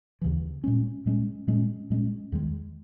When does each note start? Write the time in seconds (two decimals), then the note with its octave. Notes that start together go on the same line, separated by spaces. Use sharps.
0.21 D#2 C#3 E3
0.64 A#2 G#3 C#4
1.06 A#2 G#3 C#4
1.47 A#2 G#3 C#4
1.90 A#2 G#3 C#4
2.32 E2 D#3 G#3